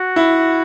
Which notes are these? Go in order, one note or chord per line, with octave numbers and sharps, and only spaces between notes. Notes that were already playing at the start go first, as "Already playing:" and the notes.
Already playing: F#4
E4